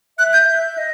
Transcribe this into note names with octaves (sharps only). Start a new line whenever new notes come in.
E5 F#6
G6
E5
D#5